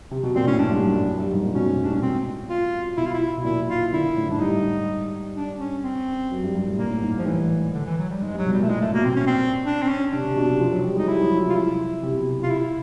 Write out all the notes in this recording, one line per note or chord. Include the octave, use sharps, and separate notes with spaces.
C3
B2
A#2 C4
A2 C#4
G#2 D4
G2
F#2
G2
F#2
G2
G#2
A#2
B2 C#4
G#2
G2
D4
A2
C#4
B2 C4
F4
B2 E4
F4
E4
B2
A#2 E4
D#3 F4
D3 E4
A2
G#2 D4
G2 D#4
D4
C#4
C4
F#2
G2
G2
A2
A#2 A#3
A2
G#2
G2
F3
A2 E3
D3
E3
F#3
G3
G#2 G#3
G2
F#3
B2
A#2 G3
A3
A2 G#3
A#2 A3
B2 A#3
B2 C4
C#4
C4
D4
C4
C#4
C3 D4
C3
B2
C3
F3
F#3
G3
G#3 D#4
G3 E4
F#3
F3
C3
F4
E4
C3
B2
C3 F4
E4